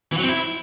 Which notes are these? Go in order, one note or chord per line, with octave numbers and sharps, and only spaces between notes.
E3
F#3
C4
E4